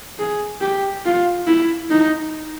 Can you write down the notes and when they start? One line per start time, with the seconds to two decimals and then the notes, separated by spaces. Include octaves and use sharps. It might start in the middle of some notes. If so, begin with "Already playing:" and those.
0.19 G#4
0.61 G4
1.05 F4
1.47 E4
1.90 D#4